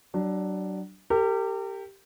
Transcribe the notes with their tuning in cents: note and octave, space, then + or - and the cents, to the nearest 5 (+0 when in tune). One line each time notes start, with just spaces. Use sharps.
F#3 +35 D4 +10
G4 +0 A#4 -40